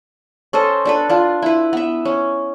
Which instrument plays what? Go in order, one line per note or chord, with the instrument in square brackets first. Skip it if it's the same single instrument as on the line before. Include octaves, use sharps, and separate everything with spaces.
[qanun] C#4 A4 C5 D#5
D4 A4 B4
D4 F4
E4 B4
B3 E5
C#4